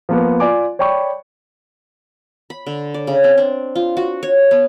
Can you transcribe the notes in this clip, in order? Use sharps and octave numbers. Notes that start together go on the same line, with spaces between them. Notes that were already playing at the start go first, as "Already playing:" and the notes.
F3 A#3 B3
F4 D5 G#5 D6
C#5 D5 G5 B5 C#6
B5
D3
D5
C#3
C4
D4
F4
F#4
C#5
B3